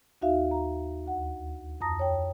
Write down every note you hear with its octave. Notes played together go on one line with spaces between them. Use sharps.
D#2 D#4 F#4 E5 F5
A#5
D2 F#5
F2 A5 A#5 D#6 A#6
C#5 G5